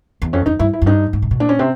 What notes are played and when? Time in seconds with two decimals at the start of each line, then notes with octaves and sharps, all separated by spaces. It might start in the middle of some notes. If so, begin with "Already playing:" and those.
0.22 E2
0.33 F2 C#4
0.46 F2 D#4
0.59 G2 E4
0.73 E4
0.82 F#2
0.86 G2 D#4
1.13 G#2
1.22 C3
1.31 B2
1.40 A#2 D4
1.49 C#4
1.59 C3 C4